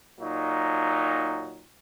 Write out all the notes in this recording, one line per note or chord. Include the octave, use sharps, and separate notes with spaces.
A#2 F#3 D#4